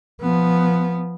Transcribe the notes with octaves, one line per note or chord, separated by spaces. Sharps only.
F3 B3